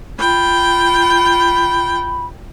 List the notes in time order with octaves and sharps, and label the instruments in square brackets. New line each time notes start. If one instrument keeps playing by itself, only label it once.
[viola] F4 G5 [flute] B5